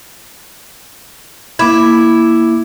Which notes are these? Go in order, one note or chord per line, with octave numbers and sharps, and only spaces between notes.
A#3 E4 D6 G#6